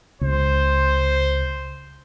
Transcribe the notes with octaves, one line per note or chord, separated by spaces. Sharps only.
C#2 C5